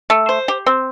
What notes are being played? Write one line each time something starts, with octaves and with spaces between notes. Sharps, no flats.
A3
C5
G4
C4